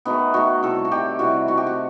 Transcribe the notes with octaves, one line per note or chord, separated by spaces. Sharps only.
D#3 F#3 A3 B3
D#3 A3 F#4
C3 E3 G3 A4
F#4
C3 D#3 G3 G4
C3 E3 G3 F#4
D#3 A3 F#4
G4
F#4